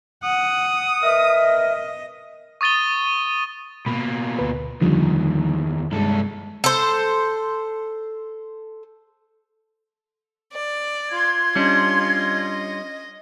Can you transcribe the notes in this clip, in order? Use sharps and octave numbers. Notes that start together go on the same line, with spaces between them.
F#5 D#6
A#4 B4 D#5 E5
C#6 D#6 A6 D#7 G7
B2 A#3 B5
D2 B4
E2 D3 D#3 F3 G3
C2 G2 G#3 A4
A4 C5
D5
F4 C6 G#6
G3 C#4 D4 D#5
D#5